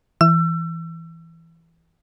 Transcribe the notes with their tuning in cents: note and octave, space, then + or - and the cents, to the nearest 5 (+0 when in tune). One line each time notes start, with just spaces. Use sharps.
E3 +0 E6 +30